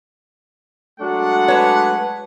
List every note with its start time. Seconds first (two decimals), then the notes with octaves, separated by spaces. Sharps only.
1.00 F#3 G#3 A3 D4 F#5
1.48 B4 C#5 A5